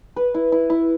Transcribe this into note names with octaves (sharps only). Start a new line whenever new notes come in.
B4
E4
E4
E4